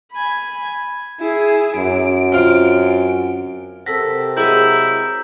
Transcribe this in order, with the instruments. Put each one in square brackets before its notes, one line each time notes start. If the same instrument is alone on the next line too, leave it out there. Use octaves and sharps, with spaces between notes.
[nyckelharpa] G#5 B5
[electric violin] E4 G#4
[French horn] F#2 [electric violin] D7
[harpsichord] C4 F4 F5
[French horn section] C3 C4 A#4 [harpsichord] A4 F#5 [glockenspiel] A#6 B6
[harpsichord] F#3 G#3 G#4 [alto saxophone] E4 [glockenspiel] A#5 G6